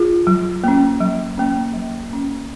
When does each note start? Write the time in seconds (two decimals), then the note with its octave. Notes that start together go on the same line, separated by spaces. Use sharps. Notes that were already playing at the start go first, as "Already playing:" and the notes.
Already playing: F4 G#4
0.27 F#3
0.64 A#3 C#4
1.01 F#3
1.38 A#3 C#4
1.73 F#3
2.11 A#3 C#4